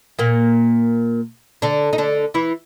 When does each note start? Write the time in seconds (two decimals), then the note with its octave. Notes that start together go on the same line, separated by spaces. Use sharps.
0.19 A#2 A#3
1.62 D3 D4
1.93 D#4
1.98 D3 D4
2.34 E3 E4